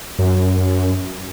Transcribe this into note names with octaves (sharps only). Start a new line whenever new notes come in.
F#2